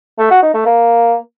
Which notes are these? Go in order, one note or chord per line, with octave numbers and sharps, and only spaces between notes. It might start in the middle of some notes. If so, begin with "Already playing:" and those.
A3
F#4
D#4
A3
A#3